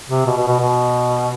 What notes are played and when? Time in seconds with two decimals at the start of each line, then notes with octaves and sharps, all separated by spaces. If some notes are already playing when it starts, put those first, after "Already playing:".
0.09 C3
0.26 B2
0.37 B2
0.48 B2
0.60 B2